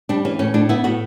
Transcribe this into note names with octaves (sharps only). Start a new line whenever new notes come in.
G3 D4
E3 C#4
A2 C#4
A2 D4
B3 E4
A2 F#4